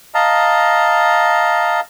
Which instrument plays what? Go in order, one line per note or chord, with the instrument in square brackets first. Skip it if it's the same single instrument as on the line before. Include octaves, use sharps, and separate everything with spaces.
[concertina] D#5 F5 A5 A#5